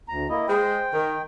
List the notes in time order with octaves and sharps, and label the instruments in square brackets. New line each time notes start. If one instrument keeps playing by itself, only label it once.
[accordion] D2 A#5
A#3 E4 D#5
[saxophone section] G#3 G#4 C5 [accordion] G5
[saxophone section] D#3